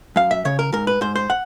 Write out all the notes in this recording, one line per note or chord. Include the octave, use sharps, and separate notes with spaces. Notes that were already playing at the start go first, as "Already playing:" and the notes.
F#2 F5
E5
C#3 C#5
A#4
G#2 A#4
B4
G#2 C5
C5
F#5